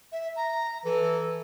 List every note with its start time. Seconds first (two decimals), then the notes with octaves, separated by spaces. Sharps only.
0.12 E5
0.36 A#5
0.85 E3 A4